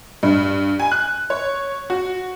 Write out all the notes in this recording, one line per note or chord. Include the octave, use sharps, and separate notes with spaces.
G2
G#5
F#6
C#5
F#4